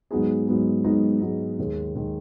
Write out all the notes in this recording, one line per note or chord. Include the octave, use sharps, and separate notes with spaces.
G#2 F#3 B3 D#4 G#4
G#2 F#3 B3 D#4 G#4
G#2 F#3 B3 D#4 G#4
G#2 F#3 B3 D#4 G#4
D#2 D#3 G#3
D#3 G#3